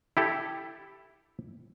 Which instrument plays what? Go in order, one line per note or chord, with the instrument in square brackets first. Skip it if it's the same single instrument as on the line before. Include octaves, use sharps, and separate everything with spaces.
[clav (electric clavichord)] E4 G4 A4